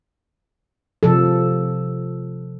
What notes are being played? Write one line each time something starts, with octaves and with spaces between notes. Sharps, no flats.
C3 F3 A4